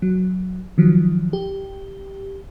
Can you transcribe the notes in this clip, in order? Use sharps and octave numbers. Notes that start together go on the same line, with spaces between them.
F#3
D#3 F3 F#3
G4